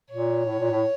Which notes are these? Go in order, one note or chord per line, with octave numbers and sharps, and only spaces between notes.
A#2 C#5
A2
A#2
A2